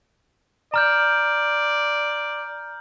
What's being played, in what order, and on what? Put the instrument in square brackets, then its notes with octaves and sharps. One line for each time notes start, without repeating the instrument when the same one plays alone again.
[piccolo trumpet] D5 [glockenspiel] A#5 F6 G6